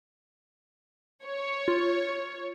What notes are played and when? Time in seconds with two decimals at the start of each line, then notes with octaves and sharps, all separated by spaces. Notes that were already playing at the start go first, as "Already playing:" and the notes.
1.24 C#5
1.68 F4